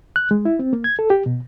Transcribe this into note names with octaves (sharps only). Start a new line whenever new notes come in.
F#6
G#3
E4
C4
A#3
G#6
A4
G4
B2